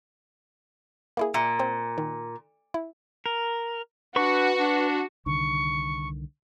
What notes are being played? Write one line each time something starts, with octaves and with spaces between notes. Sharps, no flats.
A#3 E4 G#4
A#2 E5
C4 C5
D#3
E4
A#4
D4 F#4 B4 C#6
D4
C2 D3 D#3 C#6